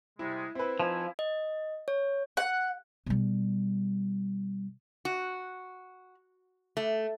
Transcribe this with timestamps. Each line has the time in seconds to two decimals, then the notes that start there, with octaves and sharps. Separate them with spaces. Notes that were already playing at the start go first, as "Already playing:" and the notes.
0.19 C3 G3 G#3 E4
0.55 C4 E4 B4
0.80 F3 D#4 E4 G#5
1.19 D#5
1.88 C#5
2.37 F#5
3.06 B2 G3
5.05 F#4
6.77 A3